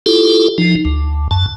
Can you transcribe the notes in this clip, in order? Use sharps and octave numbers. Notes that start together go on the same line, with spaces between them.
E4 F4 G4 A4
F3 D#4
D2
F#2 A5